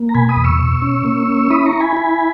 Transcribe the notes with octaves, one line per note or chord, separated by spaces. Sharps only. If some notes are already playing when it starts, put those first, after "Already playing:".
Already playing: A#3
A#5
B2 G#5 B5
B5 D#6
E2
C#6 E6
B2
C#4
A#3
C#4
E4 B5 D#6
A#5 C#6
E4
G#5 B5
E4